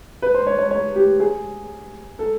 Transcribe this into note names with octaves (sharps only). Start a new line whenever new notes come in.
B4
C5
C#5
C#5
C#5
G4
G#4
A4